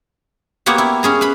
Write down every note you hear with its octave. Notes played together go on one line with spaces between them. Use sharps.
A#3 B3 G4 C#5 F#5
E4
C#4 G#4 A#5
B4 B5